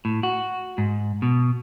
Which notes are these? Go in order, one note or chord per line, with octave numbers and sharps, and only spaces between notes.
A2
F#4
G#2
B2